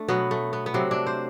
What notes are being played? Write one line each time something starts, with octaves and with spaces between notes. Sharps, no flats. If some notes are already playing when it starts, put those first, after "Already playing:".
Already playing: A3 D4
B2 F#3 B3
A3
B3
B3
C3 F#3 C4
D4
C5